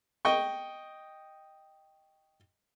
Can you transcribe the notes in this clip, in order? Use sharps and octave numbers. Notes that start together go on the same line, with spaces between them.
D#5 G5 C#6